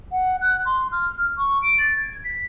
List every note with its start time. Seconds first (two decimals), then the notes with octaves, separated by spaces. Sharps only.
0.12 F#5
0.41 F#6
0.66 C6
0.92 F6
1.38 C#6
1.62 D7
1.78 A6
1.97 G#6
2.24 B6